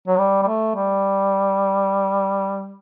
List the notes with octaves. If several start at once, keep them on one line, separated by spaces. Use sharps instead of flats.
F#3
G3
G3
A3
G3